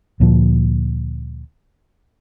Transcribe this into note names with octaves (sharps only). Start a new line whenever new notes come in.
D2 A#2 F3